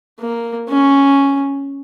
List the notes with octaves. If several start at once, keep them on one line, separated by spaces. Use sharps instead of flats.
A#3
C#4